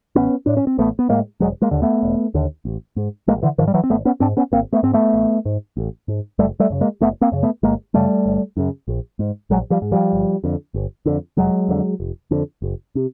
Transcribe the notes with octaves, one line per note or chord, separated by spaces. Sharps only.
A1 B3 C#4
A2 D4
C#4
C4
A1 A3 B3
B3
A2 G#3 A#3
E1 F#3 G#3
G#3 A#3
D#2 D3
A3 B3
E1
D#2 D3
A1
G#2
A1 G#3 A#3
D3 E3
G#2 D#3 F3
G3
E3 F#3
C4
G#1 A3 B3
B3 C#4
G#2 C4 D4
B3 C#4
G#1 A#3 C4
A3 B3
G#2 C4
A3 B3
A1
G#2
A1
G#2
F#1 G3 A3
G3 A3
F#2 C#3
G#3 A#3
F#1 A3 B3
A#3 C4
F#2 C#3
A3 B3
G1 G#3 A#3
F#2 C#3 G3 A3
G1
F#2 C#3
A#1
G#2
A#1 F#3 G#3
F3 G3
G#2
F3 G3
G1
F2 D3
G1
F2 D3
F1 F#3 G#3
F2 D3
F1
F2 D3
F#1
C3